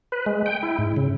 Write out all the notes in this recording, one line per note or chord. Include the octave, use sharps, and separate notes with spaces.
B4
G#3
G5
E4
G#2
C#3